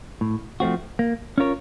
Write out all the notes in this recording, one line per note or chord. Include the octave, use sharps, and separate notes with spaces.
A2
F3 A3 C4 F#4
A#3
C#4 F4 A#4 C#5